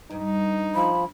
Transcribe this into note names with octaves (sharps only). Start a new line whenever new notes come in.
G2 D#4
F3 B5